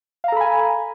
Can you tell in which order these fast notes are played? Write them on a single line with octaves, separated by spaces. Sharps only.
F5 A#5 A4 B5 G#5